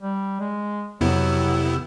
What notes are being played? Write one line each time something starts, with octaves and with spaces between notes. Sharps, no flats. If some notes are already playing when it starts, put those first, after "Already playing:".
G3
G#3
F2 C3 F#3 B3 E4 G4 E6